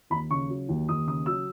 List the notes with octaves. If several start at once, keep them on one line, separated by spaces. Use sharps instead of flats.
D#2 B5
C#3 C#6
F#3
D#2
D#2 D#6
C#3 D#6
F#3 E6